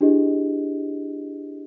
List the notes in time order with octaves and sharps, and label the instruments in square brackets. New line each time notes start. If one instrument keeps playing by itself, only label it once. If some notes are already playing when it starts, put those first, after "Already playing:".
[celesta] D4 E4 G4 G#4 D#5